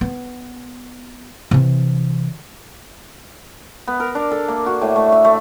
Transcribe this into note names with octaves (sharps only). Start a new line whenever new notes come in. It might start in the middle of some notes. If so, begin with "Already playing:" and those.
B3
C3 E3
B3
A#4
D4
A4
A#3
F#4
A2
A3
E5
A3